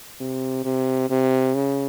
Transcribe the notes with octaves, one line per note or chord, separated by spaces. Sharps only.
C3
C3
C3
C#3